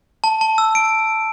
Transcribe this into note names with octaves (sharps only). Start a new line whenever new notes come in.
A5
A5
E6
D7